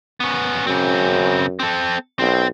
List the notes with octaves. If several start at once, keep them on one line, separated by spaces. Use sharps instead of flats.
B3 C#4
F#2 C#3 C4
C4 A4
B1 C4